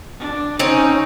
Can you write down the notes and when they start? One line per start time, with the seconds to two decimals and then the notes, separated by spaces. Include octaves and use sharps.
0.20 D4
0.59 C4 C#4 D#4